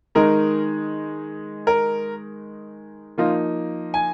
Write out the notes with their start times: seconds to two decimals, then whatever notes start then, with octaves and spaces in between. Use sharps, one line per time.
0.15 D#3 G#3 D#4 A#4
1.67 A#4
3.18 F3 A#3 D#4 F4
3.94 G#5